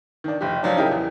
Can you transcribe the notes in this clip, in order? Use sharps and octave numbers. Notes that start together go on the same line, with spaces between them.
D#3 D4
F1 G4
F3 F#3 D4
C#3 D#4 E4 G4 G#4 A#4
E2